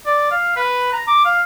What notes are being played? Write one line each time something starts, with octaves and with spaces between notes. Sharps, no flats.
D5
F5
B4
A#5
D6
F5